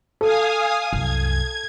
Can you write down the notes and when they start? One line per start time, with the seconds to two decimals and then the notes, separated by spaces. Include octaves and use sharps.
0.21 A4 F5 G#5 D#6
0.93 C2 F#2 G#6